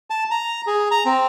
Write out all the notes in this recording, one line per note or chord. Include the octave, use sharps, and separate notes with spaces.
A5
A#5
G#4
A#5
C4